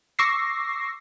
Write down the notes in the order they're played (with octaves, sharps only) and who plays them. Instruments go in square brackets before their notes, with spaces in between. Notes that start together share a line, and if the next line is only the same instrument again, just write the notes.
[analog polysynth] C#6 D6 E6 A#6 C7